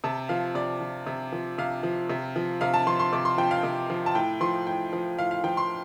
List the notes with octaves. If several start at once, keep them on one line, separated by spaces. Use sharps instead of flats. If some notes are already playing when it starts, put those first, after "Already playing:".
C3 A5
F3 F5
C3 D5
F3
C3
F3
C3 F5
F3
C3
F3
C3 F5
A5
F3 C6
C6
C3 D6
C6
F3 G5
F5
C3
F3
A5
A2 G5
F3 C6
A2 G5
F3
A2 F5
F5
F3 G5
C6